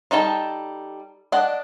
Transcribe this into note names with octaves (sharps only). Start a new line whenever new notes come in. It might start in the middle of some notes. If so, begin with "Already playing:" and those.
G3 D#4 A4 G5 A5
D4 D5 D#5 F#5